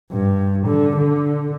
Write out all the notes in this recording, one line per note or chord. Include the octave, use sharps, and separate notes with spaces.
G2
D3
D3